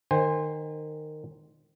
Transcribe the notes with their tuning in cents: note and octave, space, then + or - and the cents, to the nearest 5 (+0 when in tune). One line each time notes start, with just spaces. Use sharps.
D#3 -20 C5 +0 G#5 -40